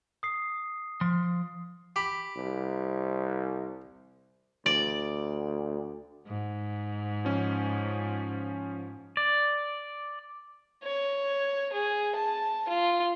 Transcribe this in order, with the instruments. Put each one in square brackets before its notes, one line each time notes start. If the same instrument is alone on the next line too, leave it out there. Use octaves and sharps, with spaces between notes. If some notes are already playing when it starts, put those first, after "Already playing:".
[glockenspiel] D#6 C7
[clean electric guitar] F3 C6
[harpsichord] G4 B5
[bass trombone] C2
[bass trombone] D2 [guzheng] D5
[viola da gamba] G#2
[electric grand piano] F3 C#4
[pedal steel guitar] D5
[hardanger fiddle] C#5
G#4
A5
F4